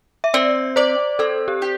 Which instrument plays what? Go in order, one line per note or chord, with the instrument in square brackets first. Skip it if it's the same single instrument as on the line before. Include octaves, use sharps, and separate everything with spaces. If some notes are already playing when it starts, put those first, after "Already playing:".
[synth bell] E5
[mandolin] C4 [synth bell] D5
[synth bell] C5 [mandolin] D5
[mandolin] C4 [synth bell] A4
[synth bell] G4
[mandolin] G4